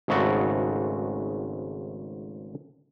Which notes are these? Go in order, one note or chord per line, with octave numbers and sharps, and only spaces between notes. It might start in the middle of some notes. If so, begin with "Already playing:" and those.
G#1 G#2 C#3 A3 F#4